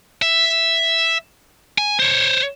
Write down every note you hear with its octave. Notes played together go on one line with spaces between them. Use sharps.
E5
G#5
C5 C#5